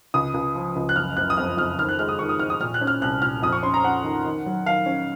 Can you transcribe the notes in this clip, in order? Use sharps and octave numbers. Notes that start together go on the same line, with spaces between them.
C#2 D#6
C#2
F3
C#2
F#6
F#1 F6
F#1 F#6
D#6
F2 F6
F2 F6
D#3 F6
F#6
G#3 F6
D#6
D#3 C#6
D#6
G#2 F6
D#6
A#2 F6
F#6
C#4
F6
C2 F#6
A#2 F6
F2 D#6
C#6
C#4 C6
A#5
C#4 F#5
D#3
D#3
F#3
D#3 F5
C#4